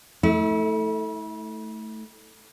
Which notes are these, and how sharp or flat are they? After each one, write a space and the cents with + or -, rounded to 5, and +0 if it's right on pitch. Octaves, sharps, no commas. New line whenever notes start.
A3 +0 E4 -35